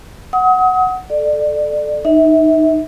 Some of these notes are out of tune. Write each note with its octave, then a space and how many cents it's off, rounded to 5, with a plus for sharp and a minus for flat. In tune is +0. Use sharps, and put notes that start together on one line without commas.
F#5 +0 D#6 +35
A4 -10 D5 +25
D#4 -10 E5 -30